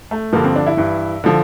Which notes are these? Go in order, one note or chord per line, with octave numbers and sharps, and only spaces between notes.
A3
G2 D3 F3 A#3
C4
D4
E4
G2 E3
D3 F3